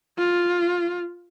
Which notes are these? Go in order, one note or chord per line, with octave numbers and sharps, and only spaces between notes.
F4